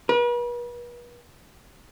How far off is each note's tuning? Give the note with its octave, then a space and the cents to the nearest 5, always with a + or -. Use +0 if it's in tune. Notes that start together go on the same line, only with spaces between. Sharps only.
B4 -40